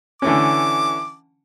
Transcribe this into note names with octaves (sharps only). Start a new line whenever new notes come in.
D3 E3 C#4 D6